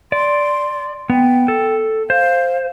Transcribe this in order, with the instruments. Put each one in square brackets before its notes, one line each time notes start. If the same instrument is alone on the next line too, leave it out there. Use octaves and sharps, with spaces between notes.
[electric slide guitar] D5 [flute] C6
[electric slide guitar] B3 [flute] G5
[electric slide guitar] A4
[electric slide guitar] C5 [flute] F5